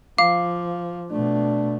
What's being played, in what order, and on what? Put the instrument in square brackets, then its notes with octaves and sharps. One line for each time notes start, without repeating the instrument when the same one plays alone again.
[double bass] F3 [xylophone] F5 [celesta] D6
[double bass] B2 A3 [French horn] D4